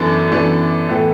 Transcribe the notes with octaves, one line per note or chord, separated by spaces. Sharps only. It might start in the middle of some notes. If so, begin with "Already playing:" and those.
Already playing: F#2 E3 B3 D4 A4
F#2 E3 B3 D4 A4
A2 E3 B3 E4 A4